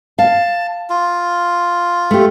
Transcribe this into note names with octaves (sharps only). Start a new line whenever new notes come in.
F5 A5
F4
A3 G4